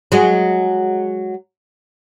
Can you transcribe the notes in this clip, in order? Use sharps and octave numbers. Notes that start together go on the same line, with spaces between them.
F#3 G#3